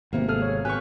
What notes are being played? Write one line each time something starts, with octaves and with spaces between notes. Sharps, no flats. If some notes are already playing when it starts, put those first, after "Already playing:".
G#1 C3 A#3 B3
G#4 A4 F6
C#5
G#1 G4 B4 G#5 C#6 F#6